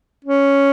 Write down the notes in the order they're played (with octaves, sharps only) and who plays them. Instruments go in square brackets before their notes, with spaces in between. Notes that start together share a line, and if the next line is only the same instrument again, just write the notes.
[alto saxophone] C#4